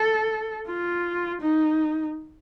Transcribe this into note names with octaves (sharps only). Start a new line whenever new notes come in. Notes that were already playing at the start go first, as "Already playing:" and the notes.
Already playing: A4
F4
D#4